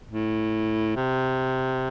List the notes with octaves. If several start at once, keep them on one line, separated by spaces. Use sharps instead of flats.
A2
C3